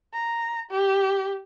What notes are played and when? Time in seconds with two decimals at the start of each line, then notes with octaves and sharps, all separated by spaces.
0.13 A#5
0.71 G4